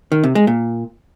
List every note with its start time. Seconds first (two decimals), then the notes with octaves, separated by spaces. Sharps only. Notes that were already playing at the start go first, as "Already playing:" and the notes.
0.12 D#3
0.23 C3
0.35 G#3
0.47 A#2